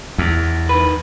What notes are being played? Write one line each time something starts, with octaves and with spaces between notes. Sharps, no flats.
E2
D#3 B4